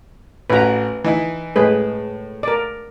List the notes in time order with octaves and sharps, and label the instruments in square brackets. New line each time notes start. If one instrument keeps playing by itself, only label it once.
[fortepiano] A1 F#4 [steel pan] B4 A#5
[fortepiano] E3 D#4 E4
[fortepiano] A2 [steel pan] G#3 G#4 B4
[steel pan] A#4 D5